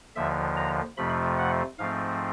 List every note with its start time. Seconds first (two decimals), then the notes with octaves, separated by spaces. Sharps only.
0.15 D#2 D3 F3 E5
0.57 A#5
0.97 F2 C3 F3 A3 B5
1.38 F#5
1.79 G#2 F3 A3 C4 F5